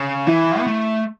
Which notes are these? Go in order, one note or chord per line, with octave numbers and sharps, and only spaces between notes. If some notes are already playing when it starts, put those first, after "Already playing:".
Already playing: C#3
E3 E4
B3
A3